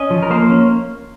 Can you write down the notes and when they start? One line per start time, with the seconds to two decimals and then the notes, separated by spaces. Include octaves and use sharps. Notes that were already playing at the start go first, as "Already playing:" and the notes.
Already playing: C#4 D#5
0.10 F3
0.23 A#4
0.30 A#3 C5
0.50 C#4